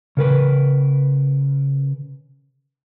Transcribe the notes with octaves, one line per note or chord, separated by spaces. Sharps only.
C#3 A#4 B4